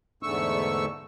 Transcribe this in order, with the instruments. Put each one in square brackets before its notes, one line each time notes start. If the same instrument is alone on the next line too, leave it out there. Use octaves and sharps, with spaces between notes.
[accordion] E2 G#2 D3 A3 C#6 E6